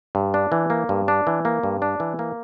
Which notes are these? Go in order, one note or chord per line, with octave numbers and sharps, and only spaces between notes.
G2
D4
E3
A#3
G2
D4
E3
A#3
G2
D4
E3
A#3